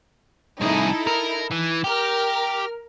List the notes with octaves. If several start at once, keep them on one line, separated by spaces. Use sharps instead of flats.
C2 D#4 E4 G#4 A4
A#4
E3
G4 A#4 F6